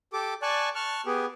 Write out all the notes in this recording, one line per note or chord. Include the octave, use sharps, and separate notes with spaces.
G4 A4 D6
D5 G#5 A5 C#6 F#6
A5 C#6 F6 F#6
B3 G4 G#4